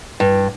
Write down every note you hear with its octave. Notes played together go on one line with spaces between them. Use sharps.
G2